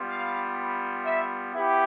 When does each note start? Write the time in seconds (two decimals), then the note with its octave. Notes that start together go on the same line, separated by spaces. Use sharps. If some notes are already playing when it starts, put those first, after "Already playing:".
Already playing: G3 B3 F4
0.09 F5
1.06 E5
1.54 B3 E4 G4